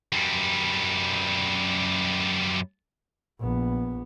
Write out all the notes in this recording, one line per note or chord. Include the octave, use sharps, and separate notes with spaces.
F#2 G3
A#1 B3